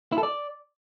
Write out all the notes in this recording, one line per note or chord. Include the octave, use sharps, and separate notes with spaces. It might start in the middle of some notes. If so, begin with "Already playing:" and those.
E4
A4
D5